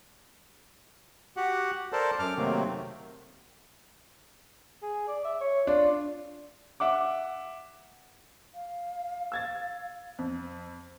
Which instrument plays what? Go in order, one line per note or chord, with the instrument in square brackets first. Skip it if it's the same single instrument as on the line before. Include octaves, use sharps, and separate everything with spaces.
[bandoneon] F#4 G4 F#5
A4 A#4 C5 D5 A5
F#2 D6 F6
C3 D#3 F#3 A3 A#3 C4
[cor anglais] G#4
D5
E5
C#5
[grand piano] D4 [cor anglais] F4
[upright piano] E5 F#5 D6
[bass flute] F5
[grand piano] E6 G#6 A6
F2